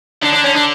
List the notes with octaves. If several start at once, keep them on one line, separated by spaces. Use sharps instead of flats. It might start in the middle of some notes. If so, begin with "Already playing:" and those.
D3 D4
D4
C#4
D4